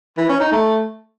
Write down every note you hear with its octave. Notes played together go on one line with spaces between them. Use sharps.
E3
C#4
D#4
A3